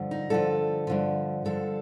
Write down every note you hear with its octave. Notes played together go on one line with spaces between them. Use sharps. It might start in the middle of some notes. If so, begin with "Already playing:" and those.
Already playing: G2 D3 F3
D#4
G2 D3 F3 A4
G2 D3 F3
G2 D3 F3 A4